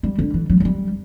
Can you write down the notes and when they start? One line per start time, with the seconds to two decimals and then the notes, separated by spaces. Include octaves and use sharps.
0.03 G3
0.19 D3
0.34 E3
0.49 F#3
0.60 F#3
0.65 G3